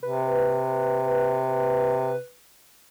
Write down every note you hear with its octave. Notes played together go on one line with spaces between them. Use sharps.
C3 B4